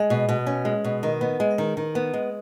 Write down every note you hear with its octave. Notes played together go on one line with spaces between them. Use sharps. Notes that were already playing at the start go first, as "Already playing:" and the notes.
Already playing: G#3
B2
B2
C#4
G#3
B2
D#3
B3
G#3
D#3
D#3
B3
G#3